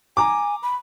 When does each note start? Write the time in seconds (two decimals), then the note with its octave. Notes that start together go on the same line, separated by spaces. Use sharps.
0.17 G#5 A#5 D6
0.63 B5